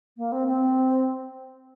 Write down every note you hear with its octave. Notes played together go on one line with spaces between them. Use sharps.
A#3
C4
C4